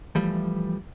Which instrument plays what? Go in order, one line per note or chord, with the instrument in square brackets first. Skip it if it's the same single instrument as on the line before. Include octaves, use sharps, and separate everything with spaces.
[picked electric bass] E3 F3 G3 A3